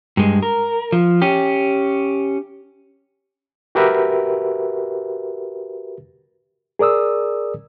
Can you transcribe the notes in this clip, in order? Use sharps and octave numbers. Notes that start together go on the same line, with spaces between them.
G2 G#3
A#4
F3
C#4 G4
F#4 G4 A#4 B4 E5
G#4 A#4 D5 D#6 E6